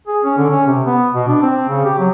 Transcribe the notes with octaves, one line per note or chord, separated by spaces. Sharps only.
G#4
C#4
D3
C#4
C3
B3
B2
D4
C4
C#3
G4
F#3